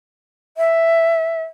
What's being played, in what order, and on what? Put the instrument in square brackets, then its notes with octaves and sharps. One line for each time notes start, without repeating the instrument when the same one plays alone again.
[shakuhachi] E5